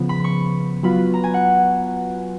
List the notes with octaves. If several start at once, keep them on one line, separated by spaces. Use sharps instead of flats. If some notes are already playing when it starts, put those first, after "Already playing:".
Already playing: C#3 F3 B3
B5
C#6
F#3 B3 F4 B4 B5
A#5
G#5
F#5